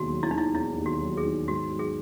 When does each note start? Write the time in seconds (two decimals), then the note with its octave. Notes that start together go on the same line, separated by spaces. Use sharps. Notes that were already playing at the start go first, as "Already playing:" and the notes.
Already playing: E1 D#2 F#4
0.08 F#3
0.23 E4
0.31 D#3 D#4
0.38 E4
0.54 E1 E4
0.78 D#2
0.86 F#4
1.01 F#3
1.17 G#4
1.25 D#3
1.48 G#2 F#4
1.72 F#3
1.79 G#4